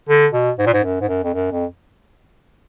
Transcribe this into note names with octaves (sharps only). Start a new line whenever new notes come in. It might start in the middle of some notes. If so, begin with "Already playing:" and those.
D3
B2
G#2
A#2
G#2
F#2
G#2
F#2
F2
F#2
F2